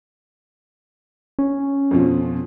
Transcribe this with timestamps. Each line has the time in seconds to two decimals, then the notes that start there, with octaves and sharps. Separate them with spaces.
1.39 C#4
1.91 F2 B2 F3